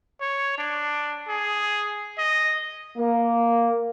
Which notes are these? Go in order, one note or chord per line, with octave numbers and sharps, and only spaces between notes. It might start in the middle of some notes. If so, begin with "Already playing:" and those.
C#5
D4
G#4
D#5
A#3